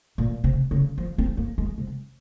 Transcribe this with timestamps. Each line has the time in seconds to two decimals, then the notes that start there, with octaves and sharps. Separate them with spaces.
0.18 A#2
0.44 C3
0.71 C#3
0.98 F3
1.18 C4
1.37 A#3
1.58 G#3
1.78 C3